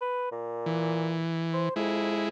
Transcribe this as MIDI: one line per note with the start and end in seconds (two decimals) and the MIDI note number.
0.01 0.30 71
0.32 1.25 46
0.66 1.69 52
1.53 1.75 72
1.76 2.28 41
1.76 2.29 56
1.76 2.29 64